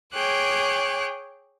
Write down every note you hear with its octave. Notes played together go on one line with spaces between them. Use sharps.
G#4 C#5 G5 D6 F#6